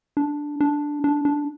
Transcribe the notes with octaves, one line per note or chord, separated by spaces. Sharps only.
D4
D4
D4
D4